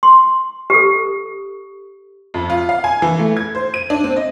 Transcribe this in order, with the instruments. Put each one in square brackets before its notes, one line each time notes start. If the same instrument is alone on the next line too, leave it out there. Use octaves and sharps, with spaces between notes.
[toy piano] C6
G4 A4
[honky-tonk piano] F2
F4
F5
G#5
E3
A3
G#6
C5
D#7
D4
C4
D#5